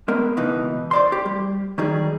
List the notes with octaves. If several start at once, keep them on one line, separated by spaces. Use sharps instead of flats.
G#3 B3 A#4
C#2 B2 E3 D#4 B4
C5 D5 C6
G4
G3
D#3 F#3 G3 D#4 G#4